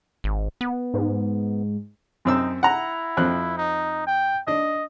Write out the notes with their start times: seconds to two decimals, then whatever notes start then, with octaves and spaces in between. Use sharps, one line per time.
0.24 G#1
0.61 B3
0.94 G#2
2.25 F#2 C4 D#4 E6
2.63 E4 F#5 A#5
3.17 F2 C4 F#6
3.58 D#4
4.07 G5
4.47 D4 D#5